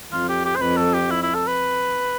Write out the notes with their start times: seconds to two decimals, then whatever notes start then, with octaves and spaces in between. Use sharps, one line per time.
0.12 F2 F4
0.29 G4
0.45 G4
0.56 C5
0.61 F2 B4
0.77 A4
0.94 G4
1.10 E4
1.23 E4
1.34 A4
1.47 B4